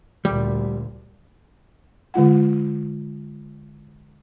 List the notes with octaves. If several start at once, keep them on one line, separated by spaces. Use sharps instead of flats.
D2 A#2 G3
D3 G#3 F4 F#5